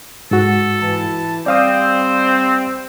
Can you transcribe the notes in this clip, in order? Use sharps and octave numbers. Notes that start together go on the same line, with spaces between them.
G#2 F#4 A4
E3 A5
G3 C4 C5 D5 F5 D#6